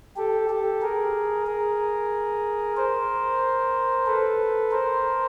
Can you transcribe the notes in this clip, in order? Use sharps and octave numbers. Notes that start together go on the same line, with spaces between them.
G4 A4
G4 A4
G#4 A#4
G#4 A#4
A#4 C5
A4 B4
A#4 C5